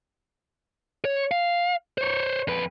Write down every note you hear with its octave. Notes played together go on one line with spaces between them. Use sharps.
C#5
F5
C5 C#5
F2 B4